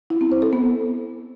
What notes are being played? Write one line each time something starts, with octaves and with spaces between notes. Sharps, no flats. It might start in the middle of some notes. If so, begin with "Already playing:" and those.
E4
C4
C5
A4
B3